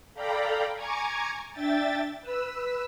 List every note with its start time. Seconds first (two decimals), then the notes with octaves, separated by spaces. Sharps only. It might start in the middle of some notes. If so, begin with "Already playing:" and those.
0.14 A4 D5 F5 G5 A#5 B5
0.75 G#5 A#5 C#6 D6 G#6
1.52 D4 E5 G5 A6
2.21 B4 E6